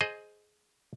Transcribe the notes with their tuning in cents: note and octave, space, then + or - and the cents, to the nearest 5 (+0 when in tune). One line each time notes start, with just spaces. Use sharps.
G#4 +15 C5 +0 D#5 +0